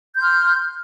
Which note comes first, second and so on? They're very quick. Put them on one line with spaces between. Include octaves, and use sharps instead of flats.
G6 C6 F6